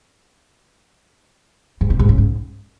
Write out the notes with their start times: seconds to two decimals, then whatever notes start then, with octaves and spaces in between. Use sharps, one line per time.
1.81 G#2
1.90 C3
1.99 G#2
2.09 C#3
2.18 G#2